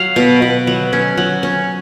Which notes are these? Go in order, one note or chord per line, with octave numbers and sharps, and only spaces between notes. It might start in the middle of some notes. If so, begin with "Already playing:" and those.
Already playing: F#3 F5
B2
B2
F#3
C#4
F#3
C#4